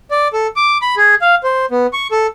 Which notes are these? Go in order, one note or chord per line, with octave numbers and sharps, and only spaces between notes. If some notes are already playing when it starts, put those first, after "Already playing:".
D5
A4
D6
B5
G#4
F5
C5
B3
C#6
A4